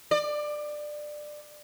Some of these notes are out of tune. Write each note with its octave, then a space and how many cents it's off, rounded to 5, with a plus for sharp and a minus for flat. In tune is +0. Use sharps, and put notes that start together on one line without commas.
D5 +20